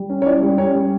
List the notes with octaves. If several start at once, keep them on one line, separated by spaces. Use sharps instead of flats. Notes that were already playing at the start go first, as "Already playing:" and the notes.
Already playing: G3
C#4
C#5
E4 D5
G3
C#4 C#5
G3